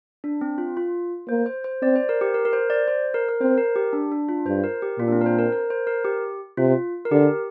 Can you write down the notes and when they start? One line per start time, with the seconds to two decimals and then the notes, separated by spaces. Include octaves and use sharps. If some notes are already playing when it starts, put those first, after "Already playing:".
0.24 D4
0.41 C4
0.58 F4
0.77 F4
1.29 A#3 C5
1.46 C5
1.64 C5
1.82 C4 D5
1.96 C5
2.09 A#4
2.21 G4
2.34 A#4
2.45 A#4
2.53 C5
2.70 D5
2.88 C5
3.14 A#4
3.29 A#4
3.41 C4 C5
3.58 A#4
3.76 G4
3.93 D4
4.12 D4
4.29 F4
4.46 G2 C5
4.64 A#4
4.82 G4
4.99 A#2 F4
5.08 D4
5.12 C4
5.21 A#4
5.26 C5
5.38 A#4
5.53 A#4
5.70 C5
5.87 A#4
6.04 G4
6.57 C3 F4
7.05 A#4
7.11 D3 G4